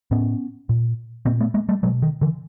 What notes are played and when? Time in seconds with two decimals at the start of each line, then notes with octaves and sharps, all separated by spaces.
0.11 A2 B3 C#4
0.69 A#2
1.26 A#2 A#3 C4
1.40 A3 B3
1.54 G#3 A#3
1.69 G3 A3
1.83 B2 F#3 G#3
2.02 D#3
2.21 D3 E3